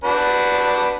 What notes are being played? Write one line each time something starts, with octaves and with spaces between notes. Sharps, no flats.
D4 F#4 B4